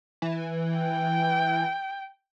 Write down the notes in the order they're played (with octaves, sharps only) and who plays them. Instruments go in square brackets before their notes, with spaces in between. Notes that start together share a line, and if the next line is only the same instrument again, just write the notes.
[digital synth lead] E3
[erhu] G5